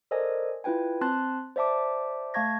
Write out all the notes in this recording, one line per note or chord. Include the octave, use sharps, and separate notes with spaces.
A4 A#4 C5 D5 D#5 G#5
E4 F4 B4 G5 G#5
C4 A5 C6 F#6 A6
C5 D5 E5 A5 D6
A3 F5 A5 C#6 G#6 A#6